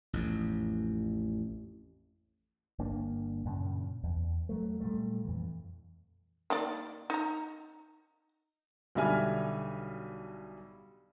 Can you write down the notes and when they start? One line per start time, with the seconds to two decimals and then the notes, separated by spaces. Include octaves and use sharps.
0.13 A1 F2
2.79 G1 A#3 D4
3.45 F#2 A#2 C#3
4.03 E2
4.49 F#3 A3
4.81 A#2 G3 A3
5.25 F2 E3
6.50 D#3 A#3 D5
7.10 D#4 A#5
8.95 B1 D3 G3 E5 G#5 F6